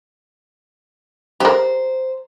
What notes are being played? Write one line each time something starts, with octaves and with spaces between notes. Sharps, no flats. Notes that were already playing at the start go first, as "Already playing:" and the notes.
G4 A#4 C5